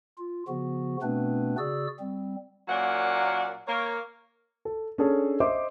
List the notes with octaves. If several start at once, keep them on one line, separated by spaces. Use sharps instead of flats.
F4
C#3 F3 B3 F#4
B2 A3 B3 C4 D4 B4
C#3 F#4 G#4 D5 E6
G3 C4
A#2 F#3 A#3 C#4 D5 F#5
A#3 C#5
A4
C#4 D4 G#4 A4 C#5
C5 D#5 E5 C6 D6